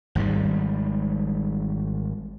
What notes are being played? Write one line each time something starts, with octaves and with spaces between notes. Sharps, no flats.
G#1 G#2 G3 G#3